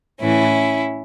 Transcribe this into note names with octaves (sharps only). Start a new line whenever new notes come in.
A2 E3 C#4 E4